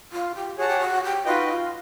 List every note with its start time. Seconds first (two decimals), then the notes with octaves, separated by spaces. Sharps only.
0.12 F4
0.35 G4
0.58 F#4 G#4 C#5 F#5 A5
0.68 G4
0.80 F#4
1.03 G4
1.25 D#4 F4 F#4 B4 D#5 G5
1.48 F4